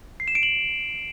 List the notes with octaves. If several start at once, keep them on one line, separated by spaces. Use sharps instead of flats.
C7
E7
D7
F#7